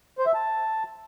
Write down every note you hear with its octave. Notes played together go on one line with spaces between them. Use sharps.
C5
E5
A5